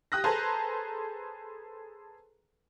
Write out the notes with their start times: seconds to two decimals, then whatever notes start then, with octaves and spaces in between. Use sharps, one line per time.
0.12 G4 D#6 F#6 A#6
0.24 G#4 A4 B4 C5 A5 A#5